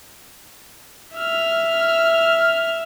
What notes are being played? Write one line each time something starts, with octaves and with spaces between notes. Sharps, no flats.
E5 F6